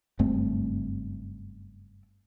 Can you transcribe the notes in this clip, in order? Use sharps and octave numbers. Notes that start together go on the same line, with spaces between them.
F#1 G2 A3 C4